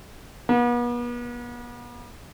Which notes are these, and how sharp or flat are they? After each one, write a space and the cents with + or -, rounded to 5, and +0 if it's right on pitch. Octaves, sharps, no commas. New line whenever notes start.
B3 -40